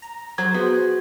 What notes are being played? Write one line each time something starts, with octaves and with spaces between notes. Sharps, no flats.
A#5
F#3 C5 G#6
B3 F#4 G#4